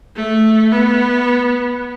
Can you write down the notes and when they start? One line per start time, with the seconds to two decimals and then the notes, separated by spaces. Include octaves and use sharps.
0.16 A3
0.72 B3